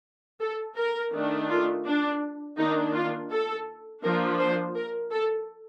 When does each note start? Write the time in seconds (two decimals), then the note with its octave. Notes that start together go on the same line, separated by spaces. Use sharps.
0.40 A4
0.77 A#4
1.12 D#3 A3 D4
1.49 F4
1.85 D4
2.58 D#3 A#3 D4 D#4
2.94 F4
3.30 A4
4.02 F3 A#3 D4 A#4
4.39 C5
4.75 A#4
5.11 A4